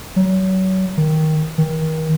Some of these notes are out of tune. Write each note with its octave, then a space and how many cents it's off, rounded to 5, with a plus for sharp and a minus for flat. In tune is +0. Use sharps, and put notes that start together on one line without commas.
F#3 +30
D#3 +10
D#3 +30